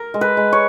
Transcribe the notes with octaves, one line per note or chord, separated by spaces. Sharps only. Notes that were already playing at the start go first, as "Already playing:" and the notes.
Already playing: A#4
G#3
B4
G#3
C#5